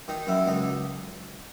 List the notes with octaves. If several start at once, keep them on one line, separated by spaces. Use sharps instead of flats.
D#3 D#4
F#2 E4
C#2 D#4